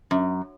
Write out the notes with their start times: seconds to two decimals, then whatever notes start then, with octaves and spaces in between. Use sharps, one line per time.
0.11 F#2